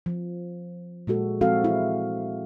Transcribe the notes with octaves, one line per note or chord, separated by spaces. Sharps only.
F3
A#2 G#3 F#4 A4
F3 G#3 C4 F#4 A4 F5
E4